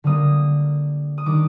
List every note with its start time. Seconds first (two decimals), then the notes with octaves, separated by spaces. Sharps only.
0.04 D3 G3 A#3 D#6
1.18 D#6
1.26 D#3 G3 D4 D6